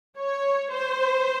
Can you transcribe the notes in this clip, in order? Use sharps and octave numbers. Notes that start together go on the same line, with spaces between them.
C#5
C5